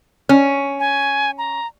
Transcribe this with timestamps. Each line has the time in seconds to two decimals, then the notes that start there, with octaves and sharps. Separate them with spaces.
0.29 C#4
0.79 G#5
1.38 A#5